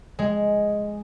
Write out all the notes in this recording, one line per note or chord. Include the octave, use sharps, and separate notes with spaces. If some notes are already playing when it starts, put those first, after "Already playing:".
G#3